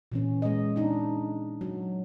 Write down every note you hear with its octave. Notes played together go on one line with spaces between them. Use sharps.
A#2 E3 C#4
G#3 D#5
D4 D#4
F#3